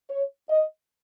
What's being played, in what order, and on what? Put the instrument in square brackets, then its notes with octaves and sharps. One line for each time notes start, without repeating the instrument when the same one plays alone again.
[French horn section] C#5
D#5